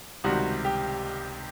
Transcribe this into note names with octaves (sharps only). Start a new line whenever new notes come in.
C#2 C3 D#3 G3 F#4
G4